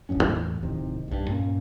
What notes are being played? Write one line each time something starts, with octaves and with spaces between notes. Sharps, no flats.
D1 G1 F#2 C#4
E2 A2
D1 C3 D#3
B1 G2
G2 A#2 A#3 C#4